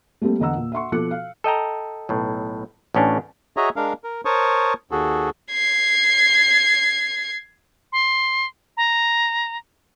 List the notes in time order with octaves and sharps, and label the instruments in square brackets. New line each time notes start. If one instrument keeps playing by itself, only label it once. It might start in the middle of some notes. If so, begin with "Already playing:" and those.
[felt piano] G3 A3 A#3 C4 A4
E2 D3 D#5 F#5 A#5 E6
A#2
E5 F#5 C6 C#6
B2 F3 A4 D6 F#6 C#7
F5
[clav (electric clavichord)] A4 D#5 G5 A#5
B1 A2
A1 A2 C#4 D4
[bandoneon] F#4 G#4 C#5 D#5 E5 A#5
G#3 D4 A#4 F5
A#4
A#4 C5 C#5 A5 C#6 D#6
D#2 F#4 G#4 A4
[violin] G#6 C7
[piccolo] C6
A#5